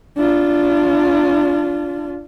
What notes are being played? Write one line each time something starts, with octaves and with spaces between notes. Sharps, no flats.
D4 F4